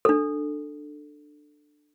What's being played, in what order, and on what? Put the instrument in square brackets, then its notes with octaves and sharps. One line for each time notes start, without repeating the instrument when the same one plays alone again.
[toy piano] D4 A4